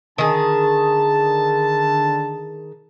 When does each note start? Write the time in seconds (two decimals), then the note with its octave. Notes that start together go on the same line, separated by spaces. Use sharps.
0.18 D3 D#3 G#4 A5